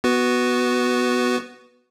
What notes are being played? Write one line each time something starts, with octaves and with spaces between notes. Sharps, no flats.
B3 F#4 B4